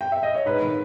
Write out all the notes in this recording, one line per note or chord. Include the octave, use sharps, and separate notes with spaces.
G5
E5
D#5
C#5
G#2 B4
D#3